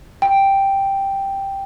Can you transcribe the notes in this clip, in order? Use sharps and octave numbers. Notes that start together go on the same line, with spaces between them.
G5